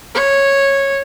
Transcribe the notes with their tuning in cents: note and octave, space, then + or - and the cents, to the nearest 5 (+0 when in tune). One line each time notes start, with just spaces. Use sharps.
C#5 -10